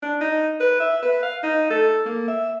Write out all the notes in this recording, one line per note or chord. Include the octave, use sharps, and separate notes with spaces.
D4
D#4
B4
E5
B4
F5
D#4
A4
A#3
E5